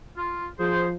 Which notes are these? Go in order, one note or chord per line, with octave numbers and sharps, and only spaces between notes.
F4
F3 G#4 C5